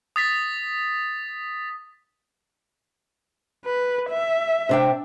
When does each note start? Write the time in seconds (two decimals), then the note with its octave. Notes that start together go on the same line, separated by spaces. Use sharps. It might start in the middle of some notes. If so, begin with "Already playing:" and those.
0.16 D#6 A6 B6
3.66 B4
4.11 E5
4.69 C3 D4 G5